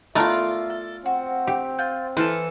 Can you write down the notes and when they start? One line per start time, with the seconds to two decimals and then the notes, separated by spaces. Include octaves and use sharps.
0.15 A3 B3 F4 A#4 D5 E5 A#5
0.70 A4
1.06 C4 F#4
1.47 G4
1.79 F4 G6
2.17 E3 A4 C5 A5 F6 F#6